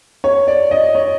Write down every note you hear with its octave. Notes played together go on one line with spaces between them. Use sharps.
C#5
D5
D#5
C#5